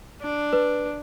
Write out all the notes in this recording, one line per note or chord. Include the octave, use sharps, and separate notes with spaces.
D4
B4